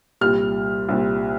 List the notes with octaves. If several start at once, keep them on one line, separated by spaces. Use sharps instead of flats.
C2 A#2 G3 F6
C2 A#2 G3